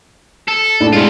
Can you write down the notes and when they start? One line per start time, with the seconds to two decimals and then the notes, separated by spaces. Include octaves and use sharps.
0.48 A4
0.80 A2 D4
0.93 C3 G#3 F4